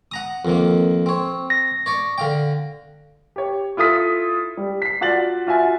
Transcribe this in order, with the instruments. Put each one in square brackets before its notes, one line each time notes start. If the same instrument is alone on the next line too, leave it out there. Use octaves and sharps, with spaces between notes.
[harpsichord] F#5 A#5 D#6
F2 D#3 A#3
C4 C#5
[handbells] A#6
[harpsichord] C#5 D5 C#6
D3 F5 G5
[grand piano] G4 C#5
E4 F4 A4 D#6 B6
G3
B6 C7
F4 F#4 D5 A6 F#7
F4 F#4 E5 G#5